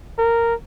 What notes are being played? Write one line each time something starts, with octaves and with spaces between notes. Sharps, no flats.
A#4